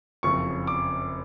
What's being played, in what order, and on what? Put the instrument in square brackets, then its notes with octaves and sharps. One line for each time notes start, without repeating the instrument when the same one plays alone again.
[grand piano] F#1 F2 C#3 F3 C#6
D6